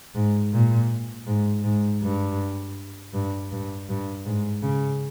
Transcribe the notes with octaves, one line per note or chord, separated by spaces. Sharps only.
G#2
A#2
G#2
G#2
G2
G2
G2
G2
G#2
C#3